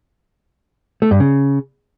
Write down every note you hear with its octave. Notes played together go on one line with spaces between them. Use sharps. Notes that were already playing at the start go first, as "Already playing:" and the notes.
A3
G2
C#3